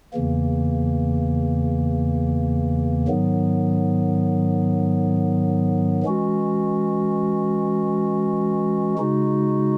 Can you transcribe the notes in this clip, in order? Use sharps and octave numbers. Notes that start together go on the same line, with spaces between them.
E2 C#3 E3 A#3
G#2 D#3 F#3 B3
E3 G#3 C#4 F#4
C#3 G#3 D#4 F#4